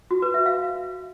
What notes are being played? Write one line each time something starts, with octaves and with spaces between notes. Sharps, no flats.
F#4
B4
E5
F5